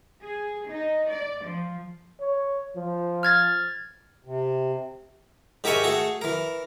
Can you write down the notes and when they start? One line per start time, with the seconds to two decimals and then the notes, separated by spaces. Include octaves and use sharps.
0.22 G#4
0.69 D#4
1.11 D5
1.44 F3
2.20 C#5
2.76 F3
3.23 F6 G#6 A6
4.25 C3
5.64 G#2 G4 A#4 E5 G#5 C#6
5.83 A3 F#4 G#4 A4
6.21 E3 A#4